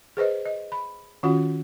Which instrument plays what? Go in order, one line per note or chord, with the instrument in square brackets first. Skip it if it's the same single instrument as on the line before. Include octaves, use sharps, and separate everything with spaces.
[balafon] G#4 B4 C5 D#5
D#5
B5
D#3 C#4 F4 F#4 F#5